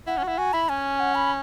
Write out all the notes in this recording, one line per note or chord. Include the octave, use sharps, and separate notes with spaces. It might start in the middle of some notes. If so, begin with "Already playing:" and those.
E4 F#5
C#4
F#4
E4
F#4 G#5
E4 B5
C#4 G#5
F#5
B5